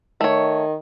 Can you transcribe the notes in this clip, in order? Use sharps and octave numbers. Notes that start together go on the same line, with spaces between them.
D#3 A3 C#5